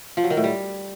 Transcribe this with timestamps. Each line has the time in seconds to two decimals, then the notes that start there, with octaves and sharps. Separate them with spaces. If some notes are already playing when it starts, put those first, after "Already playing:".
0.17 F3
0.24 F#3
0.30 D#3
0.37 A2
0.44 G3